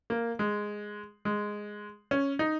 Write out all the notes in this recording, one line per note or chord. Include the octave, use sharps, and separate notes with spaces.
A#3
G#3
G#3
C#4
D#4